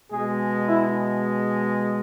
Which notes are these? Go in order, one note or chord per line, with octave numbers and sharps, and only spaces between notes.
B2 G#3 G#4
E4